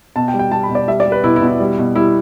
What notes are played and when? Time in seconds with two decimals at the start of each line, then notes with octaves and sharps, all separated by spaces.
0.16 B2 A5
0.28 G5
0.34 G3
0.39 G5
0.52 G3 A5
0.63 B5
0.70 B2
0.75 D5
0.88 G3 E5
1.00 D5
1.06 G3
1.12 B4
1.24 B2 E4
1.36 E4
1.41 B2
1.48 E4
1.60 G3
1.78 B2
1.96 G3 E4